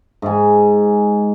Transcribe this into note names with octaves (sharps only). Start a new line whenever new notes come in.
G#2 G#5